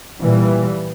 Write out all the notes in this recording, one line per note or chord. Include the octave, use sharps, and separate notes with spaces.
A#2 E3 G3